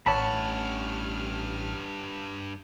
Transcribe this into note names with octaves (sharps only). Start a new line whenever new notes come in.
A1 G2 C#5 F#5 A5 B5 F6